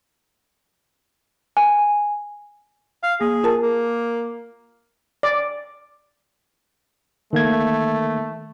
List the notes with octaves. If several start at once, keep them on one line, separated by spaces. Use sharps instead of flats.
G#5
F5
A#3 G#4
F4 A#4 A5
A#3
D5
D#3 A3 A#3 G#6